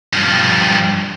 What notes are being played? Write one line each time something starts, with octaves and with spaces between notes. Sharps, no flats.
G2 F3